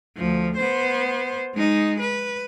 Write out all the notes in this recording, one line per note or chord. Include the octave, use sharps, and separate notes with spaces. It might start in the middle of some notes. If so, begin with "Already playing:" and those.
D2 F3
B3 C5
G#3 D#4
B4